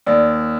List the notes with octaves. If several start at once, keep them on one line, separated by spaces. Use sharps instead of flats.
D#2 D5